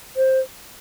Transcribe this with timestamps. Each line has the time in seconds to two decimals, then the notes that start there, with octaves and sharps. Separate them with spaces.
0.17 C5